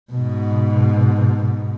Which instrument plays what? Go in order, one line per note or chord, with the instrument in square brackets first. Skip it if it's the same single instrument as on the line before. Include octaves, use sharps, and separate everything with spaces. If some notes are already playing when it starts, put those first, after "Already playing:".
[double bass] G#2 B2